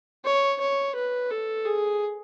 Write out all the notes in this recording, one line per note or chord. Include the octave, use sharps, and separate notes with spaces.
C#5
C#5
B4
A4
G#4